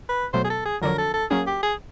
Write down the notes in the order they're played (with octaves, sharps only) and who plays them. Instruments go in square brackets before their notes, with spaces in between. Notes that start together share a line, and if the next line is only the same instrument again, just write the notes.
[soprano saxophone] B4
[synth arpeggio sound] B2 F#3 A3 [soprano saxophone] C5
[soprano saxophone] G#4
A4
G#4
[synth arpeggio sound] F2 D3 F#3 [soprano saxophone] A#4
[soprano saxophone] A4
A4
[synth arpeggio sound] F#3 A#3 C#4 [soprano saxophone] G#4
[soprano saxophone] G4
G#4